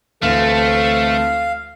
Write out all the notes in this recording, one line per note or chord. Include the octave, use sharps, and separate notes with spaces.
D2 E3 A3 C4 A4 F5 A#6